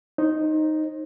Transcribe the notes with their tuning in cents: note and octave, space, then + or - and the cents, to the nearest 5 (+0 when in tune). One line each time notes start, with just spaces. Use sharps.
D#4 +0 C5 +35